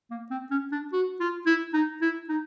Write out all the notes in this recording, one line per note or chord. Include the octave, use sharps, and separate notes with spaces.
A#3
C4
C#4
D4
F#4
F4
E4
D#4
E4
D#4